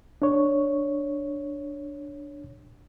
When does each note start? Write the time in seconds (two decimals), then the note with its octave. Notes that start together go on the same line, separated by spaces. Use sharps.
0.22 D4 C#5